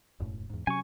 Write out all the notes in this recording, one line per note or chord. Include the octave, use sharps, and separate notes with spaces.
E1 F#2 A2
E2 G#2
C3 F#3 C#4 G#5 C#6